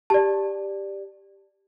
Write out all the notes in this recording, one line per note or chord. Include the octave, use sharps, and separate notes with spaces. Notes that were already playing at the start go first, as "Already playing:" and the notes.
G4 D5 A5